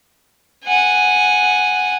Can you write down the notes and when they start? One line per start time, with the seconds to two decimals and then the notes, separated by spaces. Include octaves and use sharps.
0.64 F#5 G#5